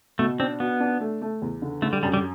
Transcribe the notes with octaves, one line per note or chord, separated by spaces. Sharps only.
B2 A3
C4 D4
B3 F#4
D4
A3
A3
E2
D3
D3 A3
G3
F#2 G3
G3